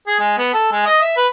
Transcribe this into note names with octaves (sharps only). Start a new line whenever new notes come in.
G#4
G#3
B3
A4
G#3
D#5
E5
B4